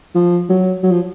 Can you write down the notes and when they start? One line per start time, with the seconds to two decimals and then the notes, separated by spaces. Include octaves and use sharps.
0.15 F3
0.49 F#3
0.83 F#3
0.91 F3